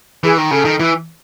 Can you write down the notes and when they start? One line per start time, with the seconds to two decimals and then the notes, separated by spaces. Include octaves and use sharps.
0.24 E3 G#4
0.37 D#3
0.51 C#3 A4
0.65 D#3
0.79 E3